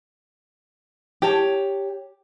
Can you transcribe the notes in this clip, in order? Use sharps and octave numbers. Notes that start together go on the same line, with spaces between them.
G4 C#5 A5